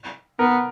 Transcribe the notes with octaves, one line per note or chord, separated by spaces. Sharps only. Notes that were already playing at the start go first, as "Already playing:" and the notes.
B3 A#4